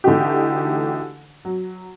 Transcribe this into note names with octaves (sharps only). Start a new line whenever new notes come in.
D3 E3 A3 D#4 F#4 G4
F#3